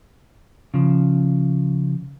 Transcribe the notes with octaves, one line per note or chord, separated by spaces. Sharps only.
C#3 F3